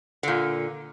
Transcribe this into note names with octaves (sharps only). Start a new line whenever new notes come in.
A#2 D3